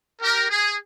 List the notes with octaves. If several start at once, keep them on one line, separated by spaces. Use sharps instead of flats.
G4 A#4
G#4